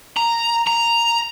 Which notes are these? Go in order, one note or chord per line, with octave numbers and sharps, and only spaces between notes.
A#5
A#5